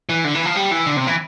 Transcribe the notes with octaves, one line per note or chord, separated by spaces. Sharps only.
E3
D3
E3
F3
G3
E3
D3
C3
E3